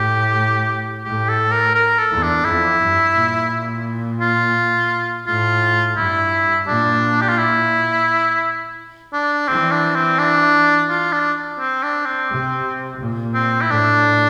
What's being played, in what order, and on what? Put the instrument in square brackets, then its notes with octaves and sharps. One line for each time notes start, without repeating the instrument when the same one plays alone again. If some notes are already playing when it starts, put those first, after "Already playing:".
Already playing: [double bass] A2 [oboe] G4
[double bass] A2 [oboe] G4
[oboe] A4
A#4
A#4
A4
[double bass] E2
[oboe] D4
[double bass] F2 [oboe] E4
[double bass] G2
A#2
[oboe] F4
[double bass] A2 [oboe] F4
[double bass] G2 [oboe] E4
[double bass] A#2 [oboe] D4
[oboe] G4
F4
E4
D4
[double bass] E3 [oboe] C4
[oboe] D4
C4
D4
F4
D4
C4
D4
C4
[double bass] C3
A#2
[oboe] C4
E4
[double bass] A2 [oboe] D4